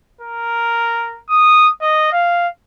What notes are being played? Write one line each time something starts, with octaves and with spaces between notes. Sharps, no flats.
A#4
D#6
D#5
F5